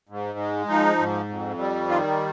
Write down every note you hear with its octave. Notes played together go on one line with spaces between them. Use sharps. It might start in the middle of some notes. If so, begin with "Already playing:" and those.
G#2
G#3
F3 D#4
G#2
F2
G3
D#3 F4